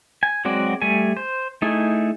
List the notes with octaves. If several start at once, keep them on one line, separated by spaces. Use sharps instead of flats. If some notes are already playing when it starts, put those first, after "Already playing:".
G#5
F#3 G#3 C4 F#4 D5
G3 A3 G#5
C5
A3 D#4 E4 G#4